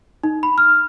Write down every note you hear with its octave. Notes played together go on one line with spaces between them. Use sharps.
D#4
B5
F6